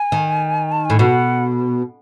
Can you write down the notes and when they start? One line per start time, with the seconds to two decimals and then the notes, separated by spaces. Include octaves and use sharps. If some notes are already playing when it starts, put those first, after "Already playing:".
Already playing: G#5
0.12 D#3
0.72 A5
0.85 A2 G#5
0.99 B2 F#5